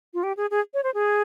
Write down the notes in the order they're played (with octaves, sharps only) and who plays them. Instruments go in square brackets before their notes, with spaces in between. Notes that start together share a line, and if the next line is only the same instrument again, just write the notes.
[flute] F4
G4
G#4
G#4
C#5
C5
G#4